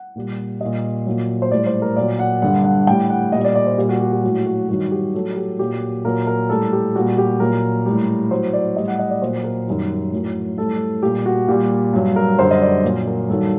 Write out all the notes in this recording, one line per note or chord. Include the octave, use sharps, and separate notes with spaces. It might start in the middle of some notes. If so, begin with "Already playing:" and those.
Already playing: F#5
A#2 G3
A#2 G3 D#5
A#2 F#3
C5
A2 G3 D5
C5
A#4
A#2 F#3 D5
F#5
G2 D3 G3 F#5
F#5
A2 G3 G5
F#5
A#2 G3 D#5
D5
D5
C5
A#2 G3 G4
F#4
G4
G4
A2 F#3 F#4
F#4
G2 D#3 F#3 F#4
G4
A2 F#3 A4
G4
A#2 F#3 G4
A#2 F#3 A#4
A#4
A2 G3 A4
G4
A#2 G3 F#4
G4
A#2 F#3 A#4
A2 G3
A2 F#3 C5
D5
A2 G3 D#5
F#5
D#5
D5
A#2 F#3 C5
A#4
F#2 D#3 G3
A2 F#3
A2 G3 A4
A#2 G3 G4
F#4
A#2 G3 G4
G2 F#3
A#4
F#2 D3 G3 C5
D#5
D5
A#2 F#3
A#4
G2 D#3 F#3 A4